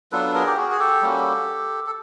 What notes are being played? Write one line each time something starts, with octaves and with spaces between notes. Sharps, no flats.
F#3 B3 D4 F4 A4 B4
G#4 A#4
G4
F#4 G#4
G#4
G4 A4
G3 A#3 C#4 F#4
A4